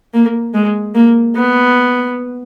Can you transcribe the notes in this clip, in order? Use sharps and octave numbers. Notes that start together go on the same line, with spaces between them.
A#3
G#3
A#3
B3